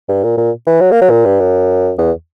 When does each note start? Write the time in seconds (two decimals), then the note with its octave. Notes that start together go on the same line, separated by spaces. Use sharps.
0.09 G2
0.23 A#2
0.38 A#2
0.67 E3
0.81 F#3
0.91 A#3
1.01 F#3
1.10 A#2
1.25 G2
1.40 F#2
1.98 E2